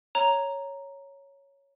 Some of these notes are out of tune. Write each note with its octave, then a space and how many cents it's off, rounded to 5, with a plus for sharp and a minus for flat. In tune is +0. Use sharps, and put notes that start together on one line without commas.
C#5 +0 A#5 +0